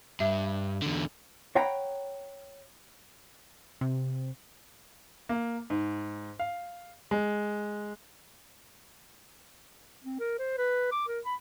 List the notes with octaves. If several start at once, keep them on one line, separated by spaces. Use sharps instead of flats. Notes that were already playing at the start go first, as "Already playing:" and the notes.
G2 E5
E2 D3
C#5 F#5 G5 A#5 B5
C3
A#3
G#2
F5
G#3
C4
A#4
C5
B4
D6
A#4
B5